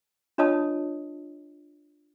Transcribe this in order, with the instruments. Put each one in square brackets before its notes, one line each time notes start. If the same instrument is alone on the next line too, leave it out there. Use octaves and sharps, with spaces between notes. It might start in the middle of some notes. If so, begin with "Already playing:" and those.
[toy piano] D4 F4 C#5 D#5 A5 D#6